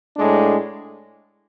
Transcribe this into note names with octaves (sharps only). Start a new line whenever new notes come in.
A2 G#3 D4